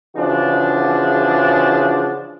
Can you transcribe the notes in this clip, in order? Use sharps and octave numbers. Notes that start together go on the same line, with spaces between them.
C#3 E3 F3 D4 F#4 G#4